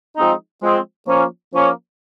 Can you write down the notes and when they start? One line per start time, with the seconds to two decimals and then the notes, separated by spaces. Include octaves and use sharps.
0.16 F3 G#3 C4 D#4
0.62 F3 G#3 C4
1.07 F3 A#3 C#4
1.53 F3 A#3 C#4